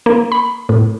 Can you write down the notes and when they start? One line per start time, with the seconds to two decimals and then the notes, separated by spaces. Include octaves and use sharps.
0.06 A#3
0.32 B5
0.69 A2